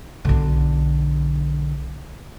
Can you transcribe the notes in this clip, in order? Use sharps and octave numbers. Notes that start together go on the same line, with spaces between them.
B1 D3